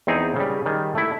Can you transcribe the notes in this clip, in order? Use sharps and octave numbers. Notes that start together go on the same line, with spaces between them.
E2 C4 D#4 G#4
C#3 G3
D#3 G3 G#4
A3 E4